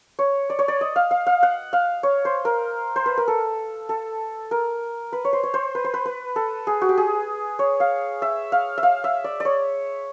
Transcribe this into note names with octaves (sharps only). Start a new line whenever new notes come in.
C#5
D5
C#5
D5
D#5
F5
F5
F5
F#5
F5
C#5
C5
A#4
C5
B4
A#4
A4
A4
A#4
B4
C#5
C5
C#5
C5
B4
C5
B4
B4
A4
G#4
F#4
G4
G#4
C#5
F5
E5
F5
E5
F5
E5
D5
C#5 D5